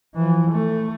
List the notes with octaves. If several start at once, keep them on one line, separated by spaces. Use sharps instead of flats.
E3 F3
A3